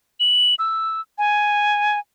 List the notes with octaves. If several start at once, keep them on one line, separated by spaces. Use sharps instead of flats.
F#7
E6
G#5